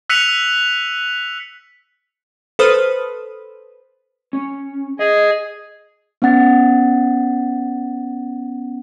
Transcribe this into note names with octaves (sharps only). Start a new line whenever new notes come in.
E6 F#6 B6 C#7 D#7 F7
A4 B4 C5 D#6 F6
C#4
G#4 D#5
B3 C#4 F#5 A6